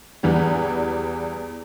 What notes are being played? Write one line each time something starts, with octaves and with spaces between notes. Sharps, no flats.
E2 E3 G3